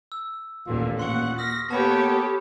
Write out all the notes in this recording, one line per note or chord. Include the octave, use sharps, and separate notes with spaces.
E6
A1 D#2 A#2 D3 F4
A#2 F#5 C6 C#6
D#6 F6 A#6 B6
A#3 B3 G4 A4 C#5 A5 B5